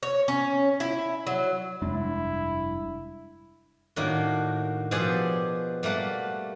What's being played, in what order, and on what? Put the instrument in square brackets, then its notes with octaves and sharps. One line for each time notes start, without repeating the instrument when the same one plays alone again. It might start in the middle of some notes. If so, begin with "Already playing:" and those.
[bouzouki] C#5
C#4
E4
F#3
[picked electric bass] F1 G2 D4 [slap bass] G#3 [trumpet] E4
[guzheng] A2 D#3 A#3 D4 F#4
B2 F3 G4 G#4 D5
G3 A3 A#3 F#5 A5